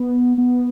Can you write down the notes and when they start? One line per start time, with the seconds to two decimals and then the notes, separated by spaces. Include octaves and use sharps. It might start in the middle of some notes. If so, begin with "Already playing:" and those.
Already playing: B3
0.38 B3